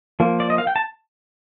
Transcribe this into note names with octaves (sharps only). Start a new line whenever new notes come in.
F3 A#3
D5
D#5
F5
G5
A5